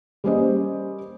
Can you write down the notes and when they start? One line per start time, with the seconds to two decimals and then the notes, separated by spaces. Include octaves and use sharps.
0.24 G3 A#3 C#4 G4 C5 D#5